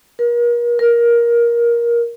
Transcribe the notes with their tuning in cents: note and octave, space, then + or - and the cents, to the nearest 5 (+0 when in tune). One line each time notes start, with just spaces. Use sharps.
A#4 +40
A#4 +15